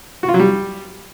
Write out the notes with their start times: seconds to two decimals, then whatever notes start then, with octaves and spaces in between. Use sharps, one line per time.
0.23 F#4
0.29 F4
0.34 F#3
0.40 G3